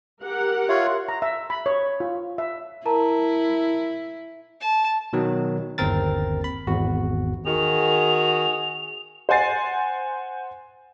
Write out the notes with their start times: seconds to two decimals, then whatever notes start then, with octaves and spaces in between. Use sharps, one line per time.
0.23 G4 A#4 F#5
0.69 F4 C#5 E5 C6
1.09 A#5
1.22 E5
1.50 B5
1.66 C#5
2.00 F4
2.38 E5
2.85 E4 A#4 A5 A#5
4.60 A5
5.13 B2 D#3 F#3
5.78 G1 D#2 C4 A#4 A6
6.44 B5
6.67 G#1 E2 F#4
7.46 D#3 F#4 G#4 F7
9.29 C5 F#5 G#5 A6 C7